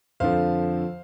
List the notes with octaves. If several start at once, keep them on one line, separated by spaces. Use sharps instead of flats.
F2 D3 F3 C5 F5